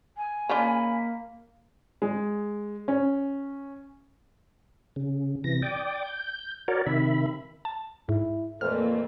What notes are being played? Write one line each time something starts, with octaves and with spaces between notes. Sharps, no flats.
G#5
C#3 A#3 D4 F4 C#5 D#5 B5
G#3
C#4
C#3
C3 E3 A#6
D5 G5 D6 D#6
G6
F#4 A#4 C#5 D5
C3 D#3 E5 B5
A5
G#2 E4
F2 A#2 E3 A3 A#3 F6